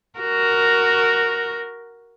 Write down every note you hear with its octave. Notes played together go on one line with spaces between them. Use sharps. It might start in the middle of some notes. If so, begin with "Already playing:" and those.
F#4 A#4